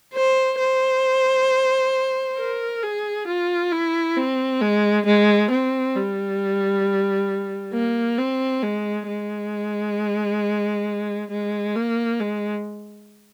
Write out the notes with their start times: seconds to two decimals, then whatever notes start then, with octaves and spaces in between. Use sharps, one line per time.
0.15 C5
0.59 C5
2.38 A#4
2.83 G#4
3.27 F4
3.72 E4
4.17 C4
4.61 G#3
5.06 G#3
5.51 C4
5.95 G3
7.74 A#3
8.18 C4
8.63 G#3
9.08 G#3
11.31 G#3
11.76 A#3
12.20 G#3